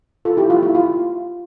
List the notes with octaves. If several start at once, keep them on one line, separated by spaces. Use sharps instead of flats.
F4 A4
E4 G4
F4
E4
F4